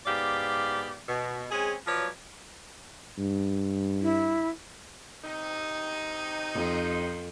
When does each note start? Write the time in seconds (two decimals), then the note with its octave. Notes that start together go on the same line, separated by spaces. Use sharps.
0.06 G#2 B3 G4 D5 F5
1.08 B2
1.51 G#3 C4 C#4 G#4
1.87 F3 F#3 B4 C#5 D5
3.18 G2
4.02 E4
5.24 C3 D#4
6.54 F2